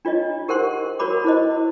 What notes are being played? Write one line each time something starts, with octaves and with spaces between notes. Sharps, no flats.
D4 F4 C#5 D#5
G4 A#4 C5 F#5 C6
F#4 A#4 C#5 B5 D6
E4 C5 D#5